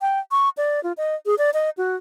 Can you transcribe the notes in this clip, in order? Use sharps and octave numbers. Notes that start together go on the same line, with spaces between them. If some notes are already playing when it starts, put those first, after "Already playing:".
G5
C#6
D5
F4
D#5
G#4
D5
D#5
F#4